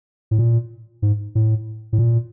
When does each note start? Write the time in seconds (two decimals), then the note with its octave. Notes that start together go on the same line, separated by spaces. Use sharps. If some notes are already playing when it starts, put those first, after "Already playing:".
0.31 A2
0.39 A#2
1.02 G#2
1.35 A2
1.93 A2
1.98 A#2